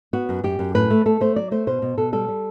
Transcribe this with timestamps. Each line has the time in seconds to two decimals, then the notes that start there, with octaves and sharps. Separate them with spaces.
0.13 B3 F#4
0.29 F#2
0.44 F#2 G4
0.59 F#2
0.75 A2 B4
0.90 A3
1.06 A3 A4
1.21 A3 C5
1.36 F#3 D5
1.51 A3 C5
1.67 B2 C5
1.82 B2
1.97 B2 A4
2.13 G3 A4
2.29 G3